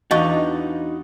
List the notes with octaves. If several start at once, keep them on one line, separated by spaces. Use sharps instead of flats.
E2 D4 D#4 F#4 G4 D#5 F5 C#6